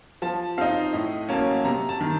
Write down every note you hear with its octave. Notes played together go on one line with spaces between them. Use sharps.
F3 A5
C4 D#4 F5
A2 D#5
F#3 A#3 C#4 A5
C3 A#5
A5
D#3